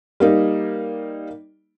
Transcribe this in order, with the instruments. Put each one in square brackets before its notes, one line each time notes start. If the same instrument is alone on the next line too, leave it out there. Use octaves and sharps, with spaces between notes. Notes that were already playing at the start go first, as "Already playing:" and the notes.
[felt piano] G3 A#3 D#4